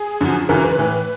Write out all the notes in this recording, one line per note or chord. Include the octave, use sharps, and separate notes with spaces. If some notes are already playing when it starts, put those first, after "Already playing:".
Already playing: G#4
F#2 D3 F3
F#2 C#3 E3 A#4
B4
A2 E3